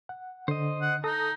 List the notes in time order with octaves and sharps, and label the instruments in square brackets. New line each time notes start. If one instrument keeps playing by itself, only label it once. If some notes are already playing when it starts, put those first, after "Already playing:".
[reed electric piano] F#5
[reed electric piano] D3 [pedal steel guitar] C5 D#5
[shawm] F#5
[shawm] D#4 [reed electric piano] A4 D#6 [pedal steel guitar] A#5